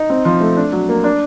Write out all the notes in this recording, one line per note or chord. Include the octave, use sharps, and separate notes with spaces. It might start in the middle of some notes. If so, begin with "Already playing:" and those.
Already playing: D#4
C4
F3
A3
D4
F#3
A#3
D4